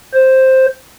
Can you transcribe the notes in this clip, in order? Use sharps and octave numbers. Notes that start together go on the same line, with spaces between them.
C5